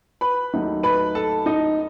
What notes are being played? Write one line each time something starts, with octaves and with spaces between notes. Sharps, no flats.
B4 B5
D#2 D#3 F#3 A3 D#4
B4 B5
A4 A5
D#4 D#5